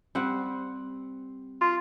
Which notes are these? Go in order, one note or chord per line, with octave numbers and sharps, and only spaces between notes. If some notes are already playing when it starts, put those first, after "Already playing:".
G3 C4 F#5
F4